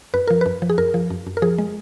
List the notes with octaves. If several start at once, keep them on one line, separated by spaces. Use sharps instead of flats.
F#2 B4
F3 A#4
F#2 B4
F3
G#4
F#2 A#4
F3
F#2
F#2
A#4
F3 G#4
G#3